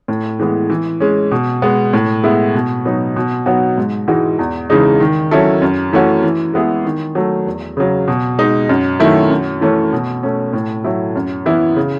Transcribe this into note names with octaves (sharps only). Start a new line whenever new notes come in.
A2
E3 G#3 B3
E3
G#3 C#4
B2
G#3 B3
A2
G#3 B3 E4
B2
F#3 B3 D#4
B2
F#3 B3 D#4 F#4
G#2
E3 G#3 D#4 F#4
E2
C#3 E3 G#3 D#4
D#3
F#3 C#4 E4 A4
F#2
E3 A3 C#4 F#4
E3
G#3 B3 E4 G#4
D#3
F#3 A3
E2
C#3 F#3
B2
G#3 D#4
F#2
D#3 F#3 A3 E4
F#2
E3 A3 C#4
B2
A3 C#4
A2
F#3 A3 E4 A4
F#2
E3 B3 E4
C#3